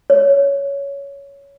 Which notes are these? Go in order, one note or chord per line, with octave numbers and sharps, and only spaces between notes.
C#5